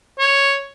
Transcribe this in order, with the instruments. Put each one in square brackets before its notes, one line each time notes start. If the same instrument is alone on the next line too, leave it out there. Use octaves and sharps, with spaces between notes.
[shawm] C#5